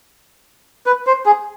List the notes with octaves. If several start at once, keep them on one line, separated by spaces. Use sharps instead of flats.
B4
C5
G#4